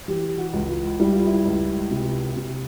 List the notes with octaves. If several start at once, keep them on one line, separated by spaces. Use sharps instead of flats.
E3 G4
F#4
C#2
F4
G3 E4
F4
E4
C#2
C3
C3